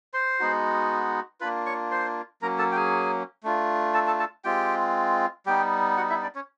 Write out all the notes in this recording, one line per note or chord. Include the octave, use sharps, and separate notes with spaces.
C5 C6
G#3 B3 D#4 F#4
A#3 D4 F4 B4 B5
C#5 C#6
C5 C6
F#3 A#3 C#4 A#4 A#5
A4 A5
G5
G#4 G#5
A3 D4 F4
A4 A5
A4 A5
A4 A5
G#3 C4 F4 G4 G5
G3 B3 D#4 G4 G5
F#4 F#5
E4 E5
D4 D5
C#4 C#5